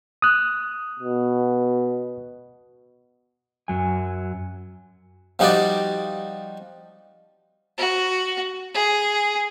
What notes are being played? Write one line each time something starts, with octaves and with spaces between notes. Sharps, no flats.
D#6 F#6
B2
F#2 F#3 G#5
F3 G3 D#4 F#4 G4 D5
F#4
G#4